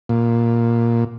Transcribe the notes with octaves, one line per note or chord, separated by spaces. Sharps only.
A#2